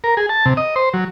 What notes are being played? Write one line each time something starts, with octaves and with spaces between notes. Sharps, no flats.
A#4
G#4
A5
C3
D#5
C5
F#3